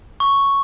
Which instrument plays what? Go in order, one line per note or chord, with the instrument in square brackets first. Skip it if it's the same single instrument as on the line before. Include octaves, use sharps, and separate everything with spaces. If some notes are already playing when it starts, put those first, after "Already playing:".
[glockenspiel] C#6